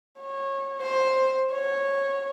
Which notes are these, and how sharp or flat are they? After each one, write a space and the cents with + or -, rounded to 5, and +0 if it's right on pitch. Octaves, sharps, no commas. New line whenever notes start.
C#5 -25
C5 +10
C#5 -10